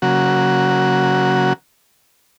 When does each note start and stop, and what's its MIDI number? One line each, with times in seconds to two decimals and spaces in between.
0.02 1.53 49
0.02 1.53 54
0.02 1.53 58
0.02 1.53 66